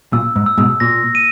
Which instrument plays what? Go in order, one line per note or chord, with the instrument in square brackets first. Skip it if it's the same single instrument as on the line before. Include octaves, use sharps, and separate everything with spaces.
[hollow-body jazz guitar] A#2 [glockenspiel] E6
[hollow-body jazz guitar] G#2
[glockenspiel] E6
[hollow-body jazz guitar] G#2 B2
[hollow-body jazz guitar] A#2 [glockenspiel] A#6
[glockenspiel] D#7